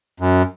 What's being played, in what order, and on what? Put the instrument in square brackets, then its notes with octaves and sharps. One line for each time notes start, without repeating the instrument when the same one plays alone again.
[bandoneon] F#2